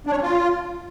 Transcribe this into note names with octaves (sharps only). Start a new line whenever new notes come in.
D4
C#5
C#4
F4